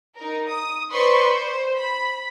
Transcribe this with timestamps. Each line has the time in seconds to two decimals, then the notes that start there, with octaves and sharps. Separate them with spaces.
0.16 D#4 A#4
0.48 D#6
0.91 B4 C5 D5 C6 C#6
1.26 C5
1.77 B5